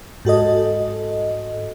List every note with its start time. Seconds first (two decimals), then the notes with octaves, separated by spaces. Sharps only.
0.25 G#2 F#4 A4 D#5